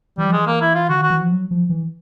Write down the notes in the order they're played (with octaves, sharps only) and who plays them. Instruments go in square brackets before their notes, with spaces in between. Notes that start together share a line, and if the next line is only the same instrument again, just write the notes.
[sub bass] E3 [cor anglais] G3
[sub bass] F3
[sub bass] E3 [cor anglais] G#3
[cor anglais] A#3
E4
F4
[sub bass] D3 [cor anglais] F#4
[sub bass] D#3 [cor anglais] F#4
[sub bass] E3
F3
F#3
F3
E3